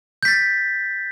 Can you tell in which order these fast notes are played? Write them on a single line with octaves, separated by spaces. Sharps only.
G6 B6 A6